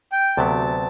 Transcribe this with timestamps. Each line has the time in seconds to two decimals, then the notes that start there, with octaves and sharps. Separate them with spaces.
0.12 G5
0.37 D2 C3 F#3 B3 A5